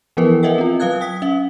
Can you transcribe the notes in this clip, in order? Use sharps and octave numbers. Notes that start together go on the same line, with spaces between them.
E3 F3 B3 E4 A#4 B4
A#4 B4 D#5 E5 F#5 G5
C4 F4
F#3 B4 F5 D#6 F#6 G#6
G5 D#6 B6
C#4 E5